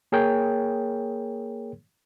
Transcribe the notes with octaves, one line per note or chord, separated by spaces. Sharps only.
A#3 G#4 A#4 C#5 G5